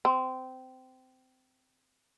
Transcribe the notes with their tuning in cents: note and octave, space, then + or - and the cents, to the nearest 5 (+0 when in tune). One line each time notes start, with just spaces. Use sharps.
C4 -20